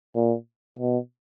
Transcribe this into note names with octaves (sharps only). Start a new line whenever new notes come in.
A#2
B2